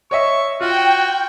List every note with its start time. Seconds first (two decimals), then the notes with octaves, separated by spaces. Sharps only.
0.11 C#5 D#5 E5 C#6
0.61 F4 F#4 G5